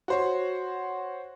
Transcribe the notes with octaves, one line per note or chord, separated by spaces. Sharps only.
F#4 C5 C#5